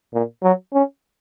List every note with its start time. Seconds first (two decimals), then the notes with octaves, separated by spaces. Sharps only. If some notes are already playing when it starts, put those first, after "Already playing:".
0.14 A#2
0.43 F#3
0.73 C#4